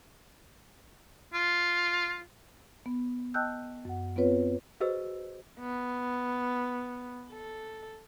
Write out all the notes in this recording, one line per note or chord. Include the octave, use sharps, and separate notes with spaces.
F4
B3
D#5 G5 A5 E6 F#6 G6
F#2 F#5
B3 C4 F4 B4 C#5
F#4 G#4 B4 C5 D#5 E6
B3
A4